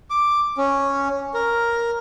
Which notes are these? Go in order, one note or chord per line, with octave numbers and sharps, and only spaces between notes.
D6
C#4
A#4